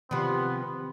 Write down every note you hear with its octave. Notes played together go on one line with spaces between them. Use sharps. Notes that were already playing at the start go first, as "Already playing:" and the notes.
C3 D#3 F3 B3 G4